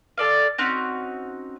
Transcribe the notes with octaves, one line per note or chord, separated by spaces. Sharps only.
A4 D5 F5
C4 C#4 D#4 F#4